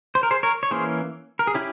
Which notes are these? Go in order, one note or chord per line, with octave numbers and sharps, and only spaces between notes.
C5
A#4
G#4 C5
A#4 C#5
C#5
E3 A#3 C#4 G#4 C5
A#4
G#4
C#4 E4 G4